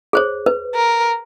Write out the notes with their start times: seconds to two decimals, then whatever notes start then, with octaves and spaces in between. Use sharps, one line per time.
0.13 G#4 C5 C#5
0.46 B4
0.75 A#4